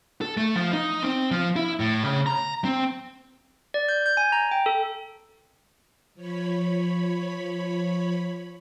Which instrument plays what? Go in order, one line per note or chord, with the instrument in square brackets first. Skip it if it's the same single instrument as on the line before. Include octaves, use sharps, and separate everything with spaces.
[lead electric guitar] A4
A3
F3
D#4
C4
F3
E4
A2
C#3
A#5
C4
[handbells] D5
G6
G6
G#5
A#5
G5
A4
[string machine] F3 C#5 B5